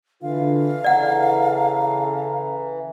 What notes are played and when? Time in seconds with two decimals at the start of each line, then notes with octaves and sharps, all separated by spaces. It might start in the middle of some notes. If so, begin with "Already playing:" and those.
0.22 D3 E3 F4 F5
0.84 C#3 A4 D5 F#5 A#5